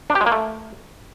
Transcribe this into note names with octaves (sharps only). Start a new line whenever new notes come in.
D4
G4
G#3
A#3
A3